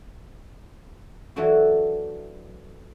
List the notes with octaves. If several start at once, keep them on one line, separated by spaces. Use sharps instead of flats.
E3 F#3 A3 D4 F#4